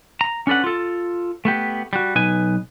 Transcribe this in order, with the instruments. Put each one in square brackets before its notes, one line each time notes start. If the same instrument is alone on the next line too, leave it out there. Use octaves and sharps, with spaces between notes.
[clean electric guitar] A#5
C#4 D4 A4 B4 F#5
F4 A4
A3 B3 G4
G3 F#4
B1 D#4 B4 G#5